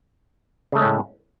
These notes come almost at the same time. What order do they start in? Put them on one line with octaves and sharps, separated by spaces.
C#3 A3 G#3 C#4 A2